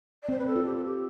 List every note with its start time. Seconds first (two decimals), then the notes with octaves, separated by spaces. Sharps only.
0.23 D5
0.29 C4 C5
0.39 B4
0.47 A4
0.56 F4
0.65 G4
0.76 A4
0.84 G4